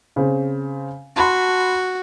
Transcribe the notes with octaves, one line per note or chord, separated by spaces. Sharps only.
C#3 C4
F#4 A5 B5 C6